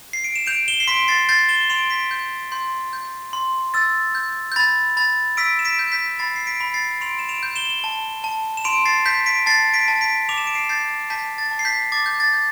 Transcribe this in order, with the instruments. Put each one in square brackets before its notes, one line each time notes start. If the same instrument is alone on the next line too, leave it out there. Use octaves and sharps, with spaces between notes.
[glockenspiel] C7
D7
E7
G6 D7 F7
E7 G7
C7
C6 B6 D7
A6 C7
G6 A6 C7
E7 G7
C6 D7 F7
B6 D7
G6
C6 G6
G6
C6
E6 A6
G6
G6
B5 A6
B5 A6
E6 B6 D7
E7
B6 D7
G6
G6 B6
B5 A6 C7
C7
B6 D7
B5
A6 C7
C6 D7 F7
E7
D7 F7
G6
E7 G7
A5
A5
E7
C6 D7 F7
A6 C7
G6 B6
B6 D7
A5 A6 C7
B6 D7
A5
B6 D7
D6 F7
E7
D7
C7 E7
G6 A6 C7
A5 G6 B6
A6
A5
C7
G6 B6
D6 A6
G6
A6
G6